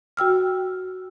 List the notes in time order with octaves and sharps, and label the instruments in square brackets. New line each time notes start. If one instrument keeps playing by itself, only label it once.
[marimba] F#4 G5 E6 F6